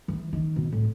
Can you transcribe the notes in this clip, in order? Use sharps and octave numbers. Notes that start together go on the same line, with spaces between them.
E3
D#3
B2
A2